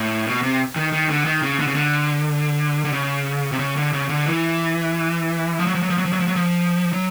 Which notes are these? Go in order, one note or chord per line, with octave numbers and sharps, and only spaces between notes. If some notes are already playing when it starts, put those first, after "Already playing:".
Already playing: A2
B2
C3
D#3
D#3
D3
D#3
C#3
D3
C#3
D3
D3
C#3
C3
C#3
D3
C#3
D3
E3
F3
F#3
F3
F#3
F3
F#3
F3
F#3
F3
F#3
F3
F#3